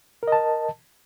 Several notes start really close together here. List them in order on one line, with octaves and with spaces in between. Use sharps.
A#4 D#5 A5